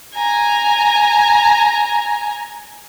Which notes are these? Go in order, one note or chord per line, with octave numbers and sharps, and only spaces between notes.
G#5 A#5